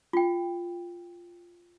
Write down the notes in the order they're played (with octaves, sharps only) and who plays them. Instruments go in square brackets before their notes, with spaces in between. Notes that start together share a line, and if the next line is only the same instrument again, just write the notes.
[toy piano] F4 G5